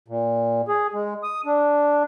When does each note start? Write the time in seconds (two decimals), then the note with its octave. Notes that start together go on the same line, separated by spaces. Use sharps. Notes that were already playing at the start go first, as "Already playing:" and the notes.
0.08 A#2
0.68 G#4
0.94 G#3
1.23 D#6
1.46 D4